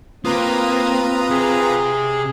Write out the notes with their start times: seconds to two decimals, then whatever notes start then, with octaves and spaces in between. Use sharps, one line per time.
0.25 A#3 C4 F4 B4 A#5 D#6
1.30 C3 G#4